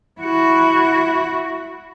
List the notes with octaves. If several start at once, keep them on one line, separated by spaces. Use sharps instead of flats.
E4 F#4